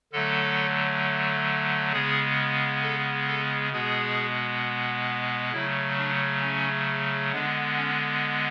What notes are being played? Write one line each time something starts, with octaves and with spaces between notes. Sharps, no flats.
D3 F#3 A3 A4
C#3 G#3 B3 G#4
A4
A4
B2 G#3 B3 G#4
C#3 F#3 A3 E4
D4
C#4
D3 G#3 B3 D4
C#4